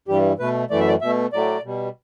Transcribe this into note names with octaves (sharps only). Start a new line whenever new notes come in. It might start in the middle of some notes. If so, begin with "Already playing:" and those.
G2 E3 G3 G4
B2 A3 B4
F#2 E3 A3 D5
E5
D5
B2 A3 E5
A2 F#3 A3 D5
B2 G3